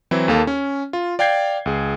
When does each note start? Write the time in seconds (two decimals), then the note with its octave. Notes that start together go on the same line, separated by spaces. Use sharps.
0.11 E3 F#3 C4 E4
0.28 D#2 A#3 A4 F5
0.47 C#4
0.93 F4
1.19 D5 F5 G5 G6 G#6 C7
1.66 C#2 G#4